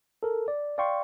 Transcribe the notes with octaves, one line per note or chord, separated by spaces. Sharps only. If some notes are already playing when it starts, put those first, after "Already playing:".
A4 A#4
D5
D5 F5 G5 C6 C#6